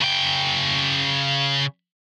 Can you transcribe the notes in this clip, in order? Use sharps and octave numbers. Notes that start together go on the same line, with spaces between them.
C#3 G5